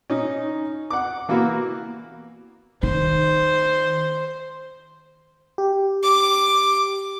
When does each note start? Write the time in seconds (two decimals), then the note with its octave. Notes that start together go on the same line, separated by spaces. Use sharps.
0.10 C#4 D#4
0.90 F#5 D6
1.29 E3 A#3 B3 F#4
2.83 D#3 C5
5.58 G4
6.03 D6